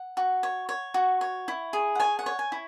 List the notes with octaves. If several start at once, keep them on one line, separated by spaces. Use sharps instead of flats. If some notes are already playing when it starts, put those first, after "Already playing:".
Already playing: F#5
F#4
C#5
C#5
F#4
C#5
E4
G#4
F#5
C#5 G#5
F#5
C#5
G#5
E4